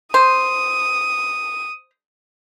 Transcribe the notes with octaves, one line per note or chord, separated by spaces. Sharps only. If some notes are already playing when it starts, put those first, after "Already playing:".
C5 D#6